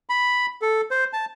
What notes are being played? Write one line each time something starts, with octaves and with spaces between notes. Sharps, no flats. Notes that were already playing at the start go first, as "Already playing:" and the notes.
B5
A4
C5
A5